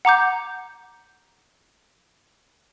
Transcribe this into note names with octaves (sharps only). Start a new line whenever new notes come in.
F#5 A#5 D6 G6